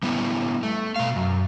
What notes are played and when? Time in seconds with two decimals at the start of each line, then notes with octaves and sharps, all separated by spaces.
0.03 G3 B3 E4
0.63 A3
0.96 B2 F5
1.16 F#2